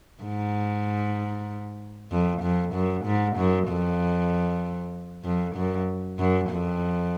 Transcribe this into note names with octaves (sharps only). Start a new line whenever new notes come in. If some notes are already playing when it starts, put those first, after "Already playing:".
G#2
F2
F2
F#2
G#2
F#2
F2
F2
F#2
F#2
F2